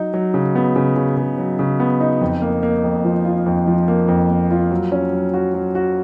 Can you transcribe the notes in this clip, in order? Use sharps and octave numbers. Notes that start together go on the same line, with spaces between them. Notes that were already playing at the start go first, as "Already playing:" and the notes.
Already playing: F#3 D#4
F#3
C#3
B3
C#3
C#3
C#3
F#3
C#3
B3
D#4
F2
A#3
A#3
F2
F3
F4
F2
F3
A#3
F2
A#3
F4
F#3
C#4
F#3
F#4
F#3
F#4